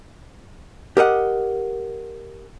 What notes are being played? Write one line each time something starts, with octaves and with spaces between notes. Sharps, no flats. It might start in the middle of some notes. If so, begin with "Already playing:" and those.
G4 A#4 D#5 F#5